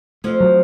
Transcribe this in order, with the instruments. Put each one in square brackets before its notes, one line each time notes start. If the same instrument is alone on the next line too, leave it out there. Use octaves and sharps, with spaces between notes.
[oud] F2 F3 [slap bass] A3
[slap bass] F#3